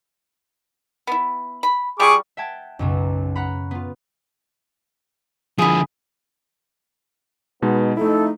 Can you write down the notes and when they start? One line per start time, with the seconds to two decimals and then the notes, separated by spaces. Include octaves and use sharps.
1.07 B3 E4
1.63 B5
2.00 G3 F4 G#4 C#6 D6
2.37 E5 F#5 G5 A5 G#6
2.79 B1 F#2 C#3
3.35 F#5 A#5 B5
3.71 B3 F4
5.59 D3 F3 E4 G#4
7.62 B2 G#3 B3 D#4
7.97 F2 A3 D#4 E4 A4